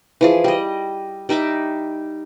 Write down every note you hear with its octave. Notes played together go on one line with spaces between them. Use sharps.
E3 F3 G#4
G3 D#5
G3 D#4 E5 D6